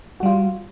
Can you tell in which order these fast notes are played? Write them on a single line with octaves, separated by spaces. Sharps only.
F#4 G3 F4